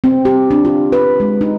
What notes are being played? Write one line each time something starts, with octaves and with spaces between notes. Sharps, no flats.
C4
G4
D4
F4
B4
G#3
D#4